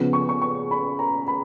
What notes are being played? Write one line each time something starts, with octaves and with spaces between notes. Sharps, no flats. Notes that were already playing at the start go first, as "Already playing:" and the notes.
Already playing: C#3 F3 B3
C#6
C#6
C#6
B5
A#5
B5